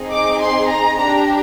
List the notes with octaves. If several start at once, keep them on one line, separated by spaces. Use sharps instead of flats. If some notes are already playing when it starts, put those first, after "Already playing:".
Already playing: C4 D#4 G#4
D6
C6
A#5
D4 G4 A#5